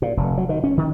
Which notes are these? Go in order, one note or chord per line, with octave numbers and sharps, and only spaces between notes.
A#2
F1
F#3
D#3
C#4
D#3